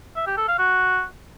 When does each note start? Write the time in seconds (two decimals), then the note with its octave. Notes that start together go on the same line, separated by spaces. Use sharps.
0.16 E5
0.27 G4
0.37 A4
0.48 F5
0.59 F#4